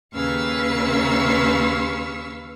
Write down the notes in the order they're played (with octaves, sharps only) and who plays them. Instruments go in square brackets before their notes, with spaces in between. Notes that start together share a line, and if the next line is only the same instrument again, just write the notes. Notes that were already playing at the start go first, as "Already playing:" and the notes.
[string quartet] D#2 C#3 B4 F5 C#6 E6